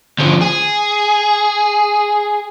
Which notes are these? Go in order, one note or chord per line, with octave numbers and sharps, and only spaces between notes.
D2 F3
G#4